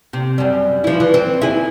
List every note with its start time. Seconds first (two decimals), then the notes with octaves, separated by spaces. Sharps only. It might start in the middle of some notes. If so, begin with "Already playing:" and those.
0.13 C3
0.38 F#2 G3
0.84 F3 E4
1.00 E3
1.14 C4
1.42 E4 G#4